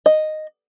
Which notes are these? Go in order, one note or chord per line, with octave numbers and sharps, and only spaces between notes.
D#5